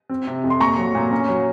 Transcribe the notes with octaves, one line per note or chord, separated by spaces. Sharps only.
C4
C3
F2
C6
A#2 A#5 C#6
F#3
A#2
C#4
F#3